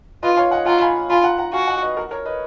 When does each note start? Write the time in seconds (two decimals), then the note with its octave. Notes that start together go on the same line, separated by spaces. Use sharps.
0.23 F4 B4 D#5
0.37 C#5 F5
0.51 D#5 F#5
0.66 F4 F#5 A#5
0.81 G#5 B5
1.10 F4 G#5 B5
1.24 F#5 A#5
1.38 F#5 A#5
1.53 F#4 F5 G#5
1.68 D#5 F#5
1.82 B4 D#5
1.97 F#4 A#4
2.11 A#4 C#5
2.25 B4 D#5